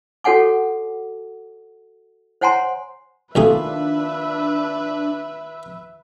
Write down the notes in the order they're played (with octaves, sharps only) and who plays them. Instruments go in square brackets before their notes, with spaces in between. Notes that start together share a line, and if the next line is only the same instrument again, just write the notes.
[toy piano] F#4 A4 C#5 F#5 G#5 D6
C5 C#5 F#5 G#5 A#5 C6
[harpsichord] B1 A3 G#4 [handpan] D#3 F4 [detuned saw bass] D4 [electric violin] B4 E5